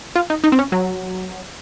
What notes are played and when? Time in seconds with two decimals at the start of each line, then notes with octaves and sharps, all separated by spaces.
0.16 F4
0.30 D#4
0.44 D#4
0.52 C4
0.59 C#4
0.72 F#3